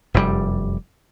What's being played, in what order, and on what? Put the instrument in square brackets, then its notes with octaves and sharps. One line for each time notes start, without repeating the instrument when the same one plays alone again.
[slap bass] F1 F#2 C3 G3